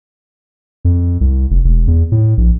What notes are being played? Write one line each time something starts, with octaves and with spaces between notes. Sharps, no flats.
F2
C2
F1
E1
E2
A2
A#1